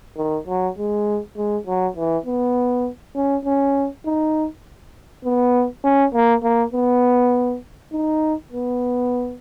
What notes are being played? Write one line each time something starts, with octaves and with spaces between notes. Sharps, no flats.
D#3
F#3
G#3
G#3
F#3
E3
B3
C#4
C#4
D#4
B3
C#4
A#3
A#3
B3
D#4
B3